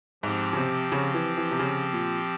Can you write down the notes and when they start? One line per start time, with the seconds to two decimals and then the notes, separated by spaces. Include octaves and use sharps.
0.23 G#2 F3 C4 G4
0.53 C#3
0.57 C3
0.92 C#3
1.14 E3
1.37 E3
1.52 C3
1.60 C#3
1.93 A#2